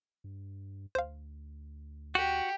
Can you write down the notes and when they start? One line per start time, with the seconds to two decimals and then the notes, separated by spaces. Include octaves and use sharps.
0.24 G2
0.95 D2 C5 F5
2.15 F#4 G4